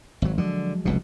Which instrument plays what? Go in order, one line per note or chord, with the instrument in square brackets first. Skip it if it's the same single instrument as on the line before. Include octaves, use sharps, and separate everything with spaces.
[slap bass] G#1 F#3
[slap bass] D3 [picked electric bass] F3 F#3 G#3
[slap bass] F1 C#2 B2